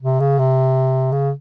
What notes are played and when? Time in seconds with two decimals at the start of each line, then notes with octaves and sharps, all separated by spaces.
0.02 C3
0.20 C#3
0.39 C3
1.12 C#3